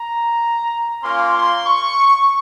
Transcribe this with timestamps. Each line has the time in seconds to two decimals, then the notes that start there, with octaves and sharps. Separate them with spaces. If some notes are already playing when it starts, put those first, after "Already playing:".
Already playing: A#5
1.03 A#3 C#4 F4 C6
1.35 C6
1.66 C#6